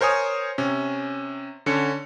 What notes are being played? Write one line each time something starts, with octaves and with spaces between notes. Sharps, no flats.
A#4 C5 C#5 G#5 D#6
C3 C#4
D3 C#4 C#7